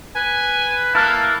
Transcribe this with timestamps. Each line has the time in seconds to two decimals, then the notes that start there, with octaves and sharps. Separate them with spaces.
0.16 B4 G#5
0.95 A#3 E4 A5 F6 F#6